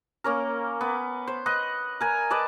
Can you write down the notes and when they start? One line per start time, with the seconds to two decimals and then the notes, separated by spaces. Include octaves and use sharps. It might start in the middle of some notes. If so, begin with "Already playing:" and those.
0.24 A#3 C#4 A#4
0.81 B3
1.27 C5
1.46 B4 D#5 F#5
2.01 A#4 G#5 A#5
2.30 B4 D5 D#5 A5